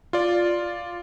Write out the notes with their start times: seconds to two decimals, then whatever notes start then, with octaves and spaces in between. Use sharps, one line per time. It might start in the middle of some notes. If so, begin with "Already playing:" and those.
0.13 F4 D5